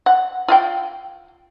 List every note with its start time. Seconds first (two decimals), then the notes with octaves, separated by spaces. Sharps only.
0.06 F#5
0.48 F4 F5 G5